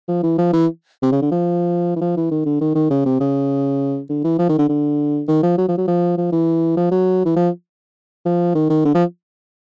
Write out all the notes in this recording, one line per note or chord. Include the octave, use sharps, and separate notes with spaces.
F3
E3
F3
E3
C3
C#3
D3
F3
E3
F3
E3
D#3
D3
D#3
D#3
C#3
C3
C#3
D3
E3
F3
D#3
D3
D3
D#3
F3
F#3
F3
F#3
F3
F3
E3
F3
F#3
E3
F3
F3
D#3
D#3
D3
F3